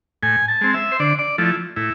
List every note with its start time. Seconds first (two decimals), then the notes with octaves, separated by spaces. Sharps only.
0.23 A2 G#5
0.48 A5
0.61 G#3 C4
0.74 E5
0.92 C5
1.00 D3 D5
1.19 D5
1.38 F3 A3 E4
1.76 A2 E4